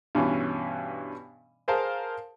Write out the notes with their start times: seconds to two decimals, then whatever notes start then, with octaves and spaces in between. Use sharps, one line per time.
0.15 G2 B2 E3 C#4
1.68 G#4 A#4 C5 F5 A5